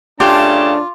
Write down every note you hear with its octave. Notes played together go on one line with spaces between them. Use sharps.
C#3 A3 D4 F4 G4 A5